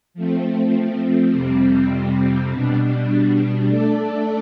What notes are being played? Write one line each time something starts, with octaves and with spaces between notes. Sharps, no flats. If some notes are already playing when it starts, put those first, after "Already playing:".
F3 A3 C4
F2 C3 G3 C4
B2 G3 D4
A3 D4 A4 D5